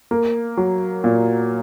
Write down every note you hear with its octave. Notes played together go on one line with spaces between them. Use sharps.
A#3
F#3
A#2